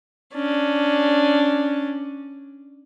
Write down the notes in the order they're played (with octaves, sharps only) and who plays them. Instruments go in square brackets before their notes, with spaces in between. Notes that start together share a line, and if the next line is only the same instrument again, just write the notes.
[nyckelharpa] C#4 D4